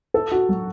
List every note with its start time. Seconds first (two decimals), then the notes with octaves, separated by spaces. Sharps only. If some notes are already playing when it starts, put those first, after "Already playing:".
0.14 A4
0.32 F#4
0.49 F#3